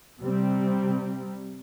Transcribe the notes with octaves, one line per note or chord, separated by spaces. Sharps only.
C3 G3 C4